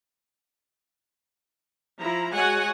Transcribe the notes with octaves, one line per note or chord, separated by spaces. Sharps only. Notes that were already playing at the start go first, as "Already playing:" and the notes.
F3 E4 A#5
G#3 F#4 C#5 F#5 G#5